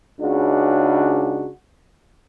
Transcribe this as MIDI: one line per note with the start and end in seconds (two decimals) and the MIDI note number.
0.20 1.48 37
0.20 1.48 49
0.20 1.48 62
0.20 1.48 63
0.20 1.48 66